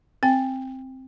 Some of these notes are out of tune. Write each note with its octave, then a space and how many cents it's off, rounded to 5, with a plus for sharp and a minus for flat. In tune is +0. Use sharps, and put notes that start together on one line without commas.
C4 +0 G5 +20